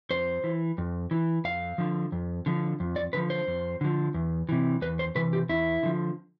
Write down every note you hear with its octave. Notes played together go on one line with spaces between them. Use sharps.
F2 C5
E3
F2
E3
F2 F5
D3 F3
F2
D3 F3
F2
D5
D3 F3 B4
C5
F2
D3 F3
E2
C3 E3
E2 B4
C5
C3 E3 B4
G4
E2 E4
D3 F3